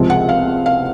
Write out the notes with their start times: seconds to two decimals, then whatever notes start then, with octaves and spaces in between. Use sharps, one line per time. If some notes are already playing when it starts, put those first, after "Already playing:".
Already playing: C#2 C3 F3 G#3
0.10 F#5
0.29 F5
0.66 F5